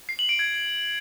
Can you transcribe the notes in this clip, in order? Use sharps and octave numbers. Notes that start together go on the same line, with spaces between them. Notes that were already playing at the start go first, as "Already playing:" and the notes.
C7
F#7
D7
G#6